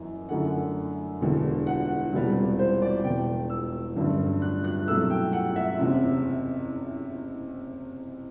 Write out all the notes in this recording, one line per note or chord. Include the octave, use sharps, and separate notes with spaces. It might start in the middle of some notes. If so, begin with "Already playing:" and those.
Already playing: F#1 F#2 E3 B3
F#2 D3 A3 E4 F#5
E1 E2 D3
F#5
E1 E2 C3 G3 B3
C5
D5
E1 E2 B2 G5
E6
A1 G2 D3 F#3
F#6
F#6
C2 B2 F#3 A3 E6
G5
F#5
E5
F#1 E2 C3